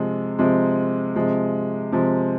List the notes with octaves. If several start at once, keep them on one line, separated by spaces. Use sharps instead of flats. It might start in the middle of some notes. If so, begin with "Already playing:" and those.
Already playing: C3 F3 G#3
C3 F3 G#3
C3 F3 G#3
C3 F3 G#3